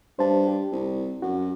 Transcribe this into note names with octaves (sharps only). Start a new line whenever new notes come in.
G2 C5 A5
G4
C2
F#2 F#4